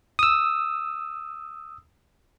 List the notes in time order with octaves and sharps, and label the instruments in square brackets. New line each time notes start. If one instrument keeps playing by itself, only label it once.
[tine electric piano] D#6 E6